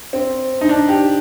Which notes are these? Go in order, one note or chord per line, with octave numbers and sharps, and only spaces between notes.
C4
D#4
D4
G4